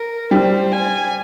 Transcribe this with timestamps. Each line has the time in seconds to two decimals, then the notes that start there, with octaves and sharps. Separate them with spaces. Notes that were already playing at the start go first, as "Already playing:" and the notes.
Already playing: A#4
0.31 G3 C5
0.72 G#5